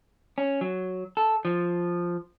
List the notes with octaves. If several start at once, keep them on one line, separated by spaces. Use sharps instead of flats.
C#4
F#3
A4
F3